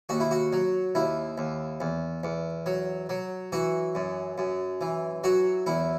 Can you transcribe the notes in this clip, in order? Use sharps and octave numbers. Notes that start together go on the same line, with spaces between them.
D#2 F#4
E4
F#4
F#3
D#2 E4
D#2
E2
E2
F#3
F#3
E3 F#4
F#2
F#2
E3
F#3 F#4
E2 E4